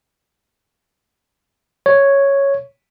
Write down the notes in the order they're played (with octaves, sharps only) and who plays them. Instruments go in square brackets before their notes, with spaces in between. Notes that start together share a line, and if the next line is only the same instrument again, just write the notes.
[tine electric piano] C#5